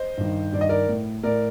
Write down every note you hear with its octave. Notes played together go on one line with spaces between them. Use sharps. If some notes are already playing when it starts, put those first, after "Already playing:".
Already playing: C5 D#5
G2 D#3
G2 D#3 D5
D#5
A#4 D5
A2
A2 A#4 D5